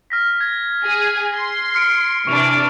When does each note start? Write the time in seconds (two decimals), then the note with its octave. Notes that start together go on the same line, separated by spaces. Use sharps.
0.10 F6 A#6 B6
0.41 G#6
0.84 G#4 G#5
1.33 C6 G#6
1.75 F6 C#7 D7
2.27 C3 E3 D4 C#6 F7